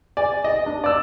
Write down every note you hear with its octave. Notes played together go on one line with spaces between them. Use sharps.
D5 G#5
D#5
D4
D5 E6